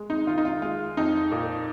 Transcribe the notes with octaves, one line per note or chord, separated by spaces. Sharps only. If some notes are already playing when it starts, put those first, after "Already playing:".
Already playing: G#3
D#4
D#3 F4
D#4
F4
G#3 F4
F2 D#4
A#2